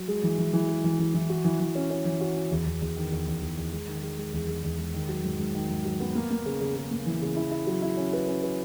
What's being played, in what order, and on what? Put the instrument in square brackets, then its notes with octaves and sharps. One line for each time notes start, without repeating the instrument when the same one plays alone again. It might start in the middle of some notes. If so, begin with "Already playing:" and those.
Already playing: [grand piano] F#3
G#3
E3
E3
E3
G#3
E3
E3
E3
F#4
E3
E3
C#4
C#4
E3
F#4
F#4
E2
E2
E2
D#3
E2
E2
E2
E2
G#3
D#3
G#3
G#3
E2
G#3
E2
G#3
D#3
F#3
G#2
G#2
D#3
G#2
F#3
B3
A#3
A#3
C#3
C#3
C#3
A#3
E3
C#3
E4
E4
F#3
E4
C#4
B4
C#4
B4